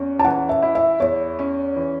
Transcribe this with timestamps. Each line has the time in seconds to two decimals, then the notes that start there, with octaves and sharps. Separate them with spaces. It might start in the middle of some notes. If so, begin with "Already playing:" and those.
Already playing: E2 C#4
0.19 A5
0.24 E3 F#5
0.49 E5
0.62 E4
0.75 E5
1.00 E2 C#5
1.39 C#4
1.76 E3